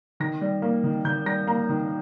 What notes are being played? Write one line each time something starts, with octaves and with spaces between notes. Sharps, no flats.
D#3 A#6
G3
A#3
D#3
D#3 G6
G3 A#6
A#3 A#5
D#3